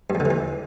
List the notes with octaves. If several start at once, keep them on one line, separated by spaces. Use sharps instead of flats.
G2
E2
D3
E3
E2